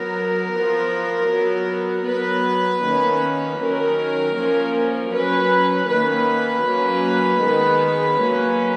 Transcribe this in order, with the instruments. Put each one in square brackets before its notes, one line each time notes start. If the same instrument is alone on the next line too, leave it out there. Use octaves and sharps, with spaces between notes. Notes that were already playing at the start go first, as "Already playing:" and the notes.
Already playing: [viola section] F#3 B3 A#4
F3 B3
F#3 B3
F#3 B3 B4
D#3 A#3 C#4
D#3 F#3 C#4 A#4
F3 A#3 C#4
F#3 C#4 B4
D#3 A#3 C#4 B4
F#3 A#3 C#4
D#3 G#3 B3
F#3 A#3 C#4